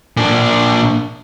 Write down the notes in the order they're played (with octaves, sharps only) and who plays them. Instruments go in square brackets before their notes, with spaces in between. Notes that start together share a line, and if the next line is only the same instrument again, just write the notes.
[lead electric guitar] A#2 D4